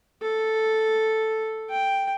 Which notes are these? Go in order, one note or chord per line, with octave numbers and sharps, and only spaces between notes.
A4
G5